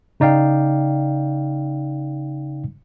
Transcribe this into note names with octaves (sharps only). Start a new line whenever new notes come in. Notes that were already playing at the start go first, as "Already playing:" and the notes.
C#3 D#4 D5 F5 G5